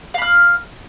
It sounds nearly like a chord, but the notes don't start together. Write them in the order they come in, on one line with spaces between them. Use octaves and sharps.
F5 B5 F6